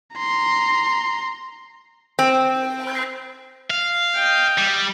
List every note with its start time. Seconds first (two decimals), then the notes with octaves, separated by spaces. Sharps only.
0.15 A#5 C6
2.19 C4
3.70 F5
4.15 D#5 G5
4.58 G3